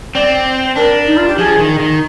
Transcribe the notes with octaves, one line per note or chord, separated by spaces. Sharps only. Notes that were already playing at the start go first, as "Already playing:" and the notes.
C4 D5
D4 A#4
D#4
F4
G4
F3 G#4
D#3
D#3